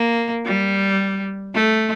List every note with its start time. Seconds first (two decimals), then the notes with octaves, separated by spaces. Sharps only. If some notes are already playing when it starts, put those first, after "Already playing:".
Already playing: A#3
0.46 G3
1.55 A3